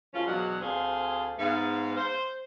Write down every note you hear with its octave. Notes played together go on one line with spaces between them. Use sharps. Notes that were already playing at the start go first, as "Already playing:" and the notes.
F#2 F3 G#3 C#4 F4
E2 B2 F#3 G#3 D4 F#5
D2 A3 C4 G#4 C5 F5
G#2 B3 F5
C5